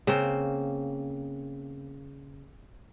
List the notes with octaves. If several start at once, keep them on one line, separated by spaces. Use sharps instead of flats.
C#3 A#3 C4